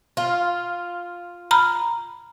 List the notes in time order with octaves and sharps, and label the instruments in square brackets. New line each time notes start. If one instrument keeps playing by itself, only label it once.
[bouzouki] F4
[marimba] A#5 B5 F6